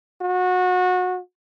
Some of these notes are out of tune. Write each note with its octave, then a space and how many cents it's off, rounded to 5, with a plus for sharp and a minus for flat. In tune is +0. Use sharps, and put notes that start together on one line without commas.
F#4 -25